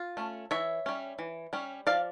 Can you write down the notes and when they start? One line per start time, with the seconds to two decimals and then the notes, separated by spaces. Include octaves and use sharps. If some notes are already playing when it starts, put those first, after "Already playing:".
Already playing: F4
0.17 A3 C#4
0.51 E3 C#5 E5
0.86 G3 C#4
1.19 E3
1.53 G3 C#4
1.87 F3 D5 F5